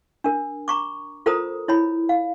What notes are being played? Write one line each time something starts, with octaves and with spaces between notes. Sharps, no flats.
D4 A#4
A#5 C#6 D6
F4 A4 A#4 C5 A#5 D#6
E4 C#5 B5
F5